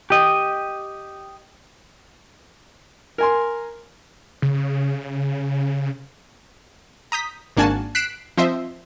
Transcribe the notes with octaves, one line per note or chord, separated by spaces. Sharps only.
G4 D#5
A#4 G#5 C6
C#3
A#5 D#6 G6 B6
G#1 A#3 D4 F#4 G#5 A5
F#6 B6 C7 D7 E7
F3 C4 C5 D#5 E5